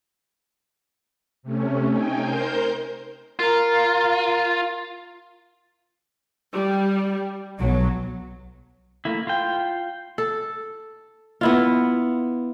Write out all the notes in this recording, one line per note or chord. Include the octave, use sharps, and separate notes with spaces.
C3 A3 C#4
D#4 G5 G#5
A#4 C5 G6
F4 A#4 A#5
G3
B1 F#3
A3 A#3 E4
F4 G5
A4
B3 E4 F4